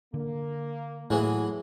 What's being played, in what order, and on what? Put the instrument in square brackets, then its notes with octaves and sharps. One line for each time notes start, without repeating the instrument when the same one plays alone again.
[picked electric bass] D3 [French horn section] A#3
[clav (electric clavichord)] A2 [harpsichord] E3 F#3 G#3